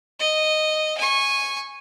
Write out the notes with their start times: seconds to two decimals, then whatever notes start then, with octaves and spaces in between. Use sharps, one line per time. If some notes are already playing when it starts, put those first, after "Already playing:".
0.20 D#5
0.97 G#5 C#6